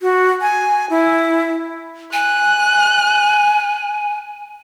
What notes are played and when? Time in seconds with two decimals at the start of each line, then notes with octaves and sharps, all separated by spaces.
0.02 F#4
0.41 G#5
0.90 E4
2.13 G#5 F#6